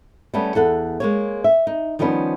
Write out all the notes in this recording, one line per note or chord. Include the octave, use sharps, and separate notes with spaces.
G3 A3 B3 C#4
E2 A4 F#5
G#3 A#3 C#5
E5
D#4
D#3 F3 G3 A3 B3 C#4